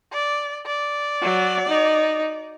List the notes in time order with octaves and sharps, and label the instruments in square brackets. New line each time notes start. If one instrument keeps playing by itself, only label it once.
[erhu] D5
D5
[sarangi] F#3
D#4